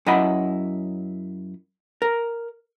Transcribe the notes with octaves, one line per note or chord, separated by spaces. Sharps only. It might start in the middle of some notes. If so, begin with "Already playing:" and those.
F#2 E4 D#5 F#5 B5
A#4